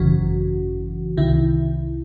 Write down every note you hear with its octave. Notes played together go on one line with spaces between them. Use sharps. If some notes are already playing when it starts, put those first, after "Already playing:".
Already playing: G#1 F#2 C#3 E3 F#4
C2 C3 D#3 E4